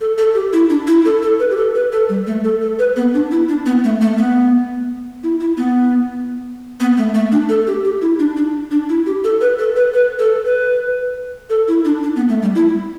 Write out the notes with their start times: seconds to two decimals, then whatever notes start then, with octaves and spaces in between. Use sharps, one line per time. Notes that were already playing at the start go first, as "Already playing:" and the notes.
0.01 A4
0.18 A4
0.35 G4
0.53 E4
0.70 D4
0.87 E4
1.05 A4
1.22 A4
1.40 B4
1.50 G4
1.57 A4
1.75 B4
1.92 A4
2.09 G3
2.27 A3
2.44 A4
2.62 A4
2.79 B4
2.96 B3
3.14 D4
3.31 E4
3.49 D4
3.66 B3
3.84 A3
4.01 A3
4.18 B3
5.23 E4
5.40 E4
5.57 B3
6.80 B3
6.97 A3
7.14 A3
7.32 D4
7.49 A4
7.67 G4
7.85 G4
8.02 E4
8.19 D4
8.37 D4
8.71 D4
8.89 E4
9.06 G4
9.24 A4
9.41 B4
9.59 A4
9.76 B4
9.94 B4
10.19 A4
10.46 B4
11.50 A4
11.68 E4
11.85 D4
12.03 D4
12.16 B3
12.29 A3
12.42 G3
12.55 E4